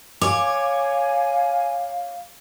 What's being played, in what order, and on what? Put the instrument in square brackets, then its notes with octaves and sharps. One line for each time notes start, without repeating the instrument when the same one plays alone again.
[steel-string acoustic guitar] C#5 [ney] F5 [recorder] G#5 [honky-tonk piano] D6